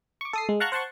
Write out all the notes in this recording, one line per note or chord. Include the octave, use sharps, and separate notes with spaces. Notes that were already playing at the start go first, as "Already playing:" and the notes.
C#6 D6
A4 D#6 C7
G#3
F5 F#5 A5 A#5 C#6 F#6
C5 F#5 A5 C6 C#6